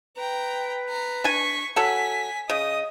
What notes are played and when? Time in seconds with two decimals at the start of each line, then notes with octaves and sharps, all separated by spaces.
0.17 B4 G5 A#5
0.89 A#5 C7
1.24 D4 G#5 C#6 B6
1.76 F#3 A4 F#5 G#5 B6
2.50 C#3 D#5 D#6